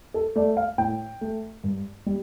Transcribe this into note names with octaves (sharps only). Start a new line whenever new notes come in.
A4
A3 D5
F5
A2 G5
A3
G2
G3